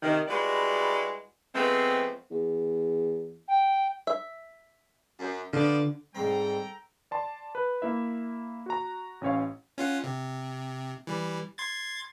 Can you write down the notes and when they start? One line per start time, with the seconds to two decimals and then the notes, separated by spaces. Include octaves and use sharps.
0.03 C3 D#3
0.28 G3 G#3 E4 F#4 B4 D5
1.55 F3 G#3 A3 B3 C4
2.31 E2
3.48 G5
4.07 E5
5.19 F#2
5.53 D3 F3 B3 D5
6.15 G#2 G3 C4 A4 G5 A#5
7.11 D5 A5 C6
7.55 B4
7.82 A#3 E4 E5
8.66 F#4 A#5
9.21 A1 C#4 C#5 F5
9.78 C#4 F4 F#5
10.04 C3
11.07 E3 G3
11.58 C6 G#6 A6